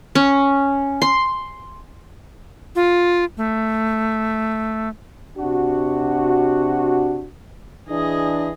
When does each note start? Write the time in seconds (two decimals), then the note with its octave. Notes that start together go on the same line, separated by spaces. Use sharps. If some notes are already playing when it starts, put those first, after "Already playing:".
0.15 C#4
1.02 C6
2.76 F4
3.37 A3
5.38 C3 D4 F#4
7.89 E3 D4 G#4 D#5